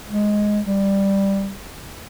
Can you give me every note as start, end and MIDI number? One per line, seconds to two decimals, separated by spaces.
0.10 0.60 56
0.65 1.52 55